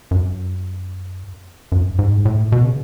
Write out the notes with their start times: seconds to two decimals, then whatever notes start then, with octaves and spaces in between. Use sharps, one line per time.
0.11 F#2
1.72 F#2
1.99 G#2
2.25 A2
2.52 B2
2.64 C#3